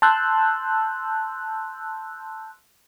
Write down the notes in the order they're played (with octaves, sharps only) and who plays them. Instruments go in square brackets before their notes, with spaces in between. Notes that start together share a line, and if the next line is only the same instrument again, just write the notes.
[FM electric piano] A5 C6 E6 F#6 G6